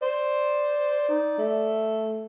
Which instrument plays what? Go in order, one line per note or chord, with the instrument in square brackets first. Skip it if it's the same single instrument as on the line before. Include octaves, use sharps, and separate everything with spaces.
[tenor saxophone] C5 [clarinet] D5
[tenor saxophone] D#4
A3